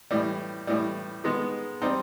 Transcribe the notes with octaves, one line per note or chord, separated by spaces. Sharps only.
A2 E3 G3
A2 E3 G3
D#3 G#3 B3
G3 C4 D#4